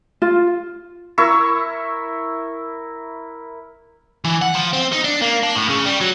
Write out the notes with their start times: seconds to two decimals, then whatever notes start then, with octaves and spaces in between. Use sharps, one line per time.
0.22 F4
1.18 E4 A#4 C#6 E6
4.25 E3
4.42 F#5
4.55 F3
4.73 C4
4.93 D#4
5.05 D4
5.22 A#3
5.43 D4
5.55 A2
5.69 C#3
5.86 G3
6.01 F#3